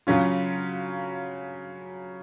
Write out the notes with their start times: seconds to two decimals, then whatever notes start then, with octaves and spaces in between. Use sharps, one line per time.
0.07 C#3 F#3 C#4 F4